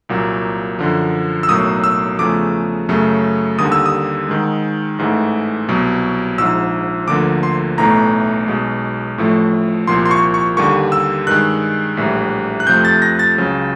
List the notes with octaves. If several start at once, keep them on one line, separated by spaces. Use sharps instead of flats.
C2 A#2 F#3 A#3
F#2 D3 F3
E6
B1 A2 F#3 A#3 D#6
E6
E2 C#3 F3 A3 D6
F#2 C#3 F#3 A3
D#2 D3 G3 A#3 D#6
E6
D#6
G#2 D#3 G#3
A1 G#2 E3 A3
C2 B2 F#3
A#1 G#2 F3 E6
D2 D3 F3 A#3 D6
C6
B1 A2 E3 A3 A#5
B1 B2 G#3
A1 A2 F3 A3
C2 A#2 F3 A#3 C6
C6
C#6
C#6
D#2 D3 G3 A#3 C#6
E6
G2 D#3 G#3 F#6
A#1 A2 E3 G3
F#6
F2 C3 F3 A3 G6
A6
A#6
A6
C#2 C#3 F#3